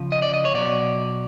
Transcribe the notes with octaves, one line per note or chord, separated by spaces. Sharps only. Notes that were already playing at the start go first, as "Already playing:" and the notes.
Already playing: C#3 F3
D#5
D5
D#5
C#5
B2 F#3 D5